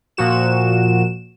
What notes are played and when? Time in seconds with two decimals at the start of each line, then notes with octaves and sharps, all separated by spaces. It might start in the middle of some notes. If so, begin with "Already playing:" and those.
0.17 A#2 F3 F#4 E7